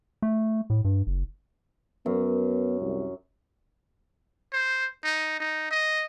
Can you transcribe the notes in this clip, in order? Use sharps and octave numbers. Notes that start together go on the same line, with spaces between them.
A3
A2
G2
F#1
F#2 B3
C2
C5
D#4
D#4
D#5